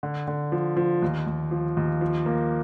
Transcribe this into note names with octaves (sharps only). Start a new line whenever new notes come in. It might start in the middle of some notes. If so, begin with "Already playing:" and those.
D3
D3
F3
F3
D#2
D#2
F3
D#2
F3
A#3